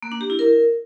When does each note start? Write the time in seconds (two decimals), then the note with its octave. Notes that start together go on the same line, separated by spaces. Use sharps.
0.02 A#3
0.12 D4
0.21 G4
0.30 E4
0.39 A#4